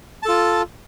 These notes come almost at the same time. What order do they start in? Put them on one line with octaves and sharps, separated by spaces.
A5 A4 F4